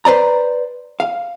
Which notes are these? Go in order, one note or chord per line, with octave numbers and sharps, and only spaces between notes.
B4 C5 D5 A#5
F5